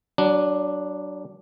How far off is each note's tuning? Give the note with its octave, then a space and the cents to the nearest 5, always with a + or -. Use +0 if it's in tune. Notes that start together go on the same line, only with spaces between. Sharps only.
F#3 +30 D4 +0